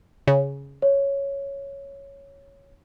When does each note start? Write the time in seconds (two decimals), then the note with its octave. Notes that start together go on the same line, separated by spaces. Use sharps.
0.27 C#3
0.82 C#5